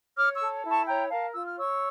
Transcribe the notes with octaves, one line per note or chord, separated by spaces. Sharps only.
C#5 D6 F6
C#6 E6
A4
E4
A5 C#6
C#5 G5 A#5
A#4 F5 A5
F4 E6
F6
C#5 C#6 E6